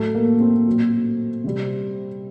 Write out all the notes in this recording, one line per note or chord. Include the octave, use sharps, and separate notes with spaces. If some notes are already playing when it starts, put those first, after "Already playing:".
Already playing: A2 F#3 A3
A#3
C4
A#2 F#3
C3 G3